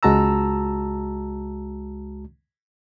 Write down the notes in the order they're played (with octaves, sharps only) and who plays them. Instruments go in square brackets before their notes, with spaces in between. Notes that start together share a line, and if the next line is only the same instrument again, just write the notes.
[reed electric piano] C#2 G#3 F#4 A5 A#5 E6